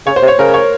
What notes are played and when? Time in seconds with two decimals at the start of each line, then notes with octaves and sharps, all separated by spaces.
0.06 C#3 C#5
0.16 C5
0.22 C3
0.28 C#5
0.39 C#3 A#4
0.54 C#5